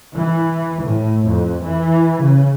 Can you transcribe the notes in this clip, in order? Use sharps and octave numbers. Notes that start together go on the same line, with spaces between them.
E3
A2
F2
E3
C#3